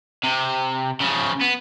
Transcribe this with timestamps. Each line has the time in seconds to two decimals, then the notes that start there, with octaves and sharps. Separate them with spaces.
0.23 C3
1.00 C#3 F3
1.41 B3